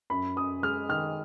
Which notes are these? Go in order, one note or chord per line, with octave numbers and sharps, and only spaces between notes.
F#2 B5
F#2 D#6
G#3 F6
D#3 F6